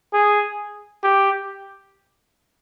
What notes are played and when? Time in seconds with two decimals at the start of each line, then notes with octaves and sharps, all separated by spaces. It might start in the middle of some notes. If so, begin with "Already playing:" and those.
0.13 G#4
1.03 G4